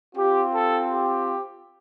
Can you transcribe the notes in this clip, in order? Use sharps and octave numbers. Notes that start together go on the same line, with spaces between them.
C4 F4 G4
A4
G4